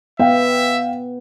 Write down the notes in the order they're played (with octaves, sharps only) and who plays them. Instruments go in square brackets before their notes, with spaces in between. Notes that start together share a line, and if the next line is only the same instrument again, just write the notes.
[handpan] B3 [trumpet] E5 [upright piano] F5 G5